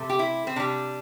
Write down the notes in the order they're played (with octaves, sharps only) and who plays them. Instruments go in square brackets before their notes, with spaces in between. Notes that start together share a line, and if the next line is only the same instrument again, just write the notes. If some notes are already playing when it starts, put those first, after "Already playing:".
Already playing: [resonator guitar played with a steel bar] C3 A3
G4
E4
C4
C3 G3 D4